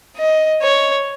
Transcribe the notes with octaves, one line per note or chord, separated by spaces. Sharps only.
D#5
C#5